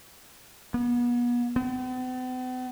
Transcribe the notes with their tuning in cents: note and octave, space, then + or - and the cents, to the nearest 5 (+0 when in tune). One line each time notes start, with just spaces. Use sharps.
B3 -35
B3 +45